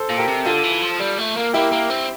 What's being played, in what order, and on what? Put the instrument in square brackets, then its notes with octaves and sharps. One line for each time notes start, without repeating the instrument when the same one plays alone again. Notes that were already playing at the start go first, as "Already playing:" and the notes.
Already playing: [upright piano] A4 C5
[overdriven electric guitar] A#2
[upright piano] G4 A#4
[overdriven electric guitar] C3
[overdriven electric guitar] D3 [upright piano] F4 A4
[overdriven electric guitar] E3
F3
G3
A3
A#3
[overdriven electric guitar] A#3 [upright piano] E4 G4
[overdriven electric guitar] A#3
C4